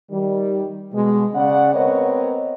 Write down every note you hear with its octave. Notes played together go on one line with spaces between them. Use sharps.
D#3 G3
B2 G#3
C#3 C#4 D5 F#5
B3 C4 A#4 B4 C#5 D#5